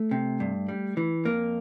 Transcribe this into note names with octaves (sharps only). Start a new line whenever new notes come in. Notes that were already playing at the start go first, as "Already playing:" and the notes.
Already playing: A3
C3
G2
G3
E3
F2 A#3